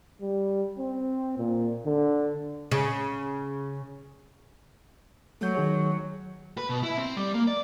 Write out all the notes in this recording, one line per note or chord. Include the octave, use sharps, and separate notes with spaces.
G3
C4
A#2
D3
C#3
F#3 A3 G6
D#3 G#4 C#5
B4
B2
E4
C4
G3
A#3
D5